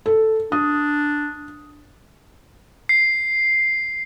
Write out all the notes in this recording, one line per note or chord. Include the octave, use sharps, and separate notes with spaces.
A4
D4 D#6
C7